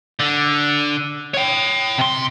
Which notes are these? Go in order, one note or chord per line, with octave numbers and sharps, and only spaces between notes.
D3
C#5 G5
C3 C6